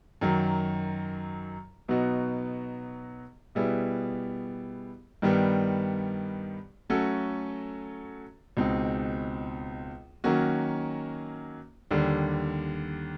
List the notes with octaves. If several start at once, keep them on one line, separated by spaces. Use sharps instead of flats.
F#2 D#3 F#3
B2 F#3 B3 D#4 F#4
B2 G3 B3 E4 G#4
G2 D#3 G3 B3
F#3 A3 C#4 F#4 A4
C#2 B2 G#3 C4 D#4
D#3 F#3 A#3 C#4 F#4
D#2 D3 G3